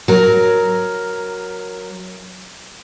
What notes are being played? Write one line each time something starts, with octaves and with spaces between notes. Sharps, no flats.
F#3 A#4